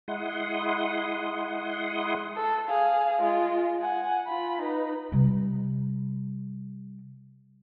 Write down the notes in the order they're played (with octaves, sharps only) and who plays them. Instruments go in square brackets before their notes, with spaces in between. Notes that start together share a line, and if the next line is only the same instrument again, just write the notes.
[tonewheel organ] G#3 E4 F#5 C6 D#6
[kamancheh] A4
G#4 F5
G#3 F4
F#5 G#5
F4 B5
D#4 B4
[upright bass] C3 G3